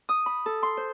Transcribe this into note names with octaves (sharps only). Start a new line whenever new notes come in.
D#6
B5
A4
C6
C5